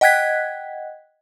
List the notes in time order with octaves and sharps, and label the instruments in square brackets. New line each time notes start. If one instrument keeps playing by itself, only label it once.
[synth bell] D#5 F#5 G5 F#6 G#6 B6